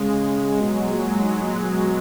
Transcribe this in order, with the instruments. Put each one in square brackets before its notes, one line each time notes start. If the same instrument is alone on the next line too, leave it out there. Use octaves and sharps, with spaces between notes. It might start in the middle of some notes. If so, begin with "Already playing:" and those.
Already playing: [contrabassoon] C#3 [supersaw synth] G#3
[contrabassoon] B2 [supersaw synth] F#3
[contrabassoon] B2
A#2
G#2
A#2
B2